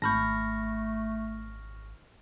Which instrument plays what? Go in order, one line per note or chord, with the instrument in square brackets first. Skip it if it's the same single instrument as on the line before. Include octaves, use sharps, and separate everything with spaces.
[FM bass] G#1 [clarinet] A3 [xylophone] A5 B5 G6 [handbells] C#6 F6 A#6